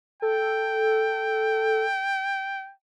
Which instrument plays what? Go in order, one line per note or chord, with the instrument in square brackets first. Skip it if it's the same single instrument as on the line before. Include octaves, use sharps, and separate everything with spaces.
[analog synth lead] A4 [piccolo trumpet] G5